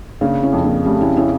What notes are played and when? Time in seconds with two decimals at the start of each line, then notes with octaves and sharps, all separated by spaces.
0.21 C#3 A#3 D4
0.42 C#4 E4
0.53 F2
0.64 A#3 D4
0.85 G3 A3 C#4
1.01 C#4 E4
1.16 C#4 E4